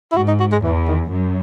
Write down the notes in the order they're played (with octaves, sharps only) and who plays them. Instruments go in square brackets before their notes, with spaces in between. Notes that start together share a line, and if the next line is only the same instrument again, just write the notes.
[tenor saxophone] E4
[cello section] G#2 [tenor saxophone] F#4
[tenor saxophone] D#4
F#4
G#3
[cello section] E2 [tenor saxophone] E3
[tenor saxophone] D#3
[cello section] F#2